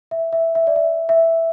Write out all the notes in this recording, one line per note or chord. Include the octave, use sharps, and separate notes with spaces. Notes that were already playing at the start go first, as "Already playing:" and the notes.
E5
E5
E5
D5
E5
E5